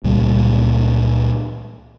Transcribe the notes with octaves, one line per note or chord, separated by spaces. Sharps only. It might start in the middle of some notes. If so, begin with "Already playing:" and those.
C#2 A#2 G3